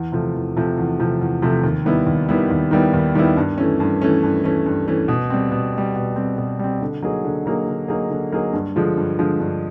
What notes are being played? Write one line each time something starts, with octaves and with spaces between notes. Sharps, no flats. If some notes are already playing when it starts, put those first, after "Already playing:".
Already playing: E2
C3 F3 A3
E2
C3 F3 A3
E2
C3 F3 A3
E2
C3 F3 A3
D#2
D#3 G3 B3 E4
D#2
D#3 G3 B3 E4
D#2
D#3 G3 B3 E4
D#2
D#3 G3 B3 E4
G2
E3 A3 C#4
G2
E3 A3 C#4
G2
E3 A3 C#4
G2
E3 A3 C#4
B2
G3 C4
B2
G3 C4
B2
G3 C4
B2
G3 C4
D3
F#3 A#3 D#4 G#4
D3
F#3 A#3 D#4 G#4
D3
F#3 A#3 D#4 G#4
D3
F#3 A#3 D#4 G#4
G2
D3 F3 G#3
G2
D3 F3 G#3
G2